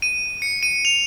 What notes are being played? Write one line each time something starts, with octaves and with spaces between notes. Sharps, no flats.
D#7
C#7
D#7
F7